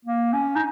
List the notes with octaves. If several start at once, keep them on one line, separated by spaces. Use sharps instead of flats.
A#3
C#4
D#4